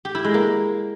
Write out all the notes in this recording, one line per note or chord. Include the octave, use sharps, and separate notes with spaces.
G4
E4
G#3
A#3